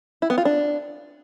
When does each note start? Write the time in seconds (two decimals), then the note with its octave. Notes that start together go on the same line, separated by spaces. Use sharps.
0.22 E4
0.30 B3
0.38 F4
0.45 D4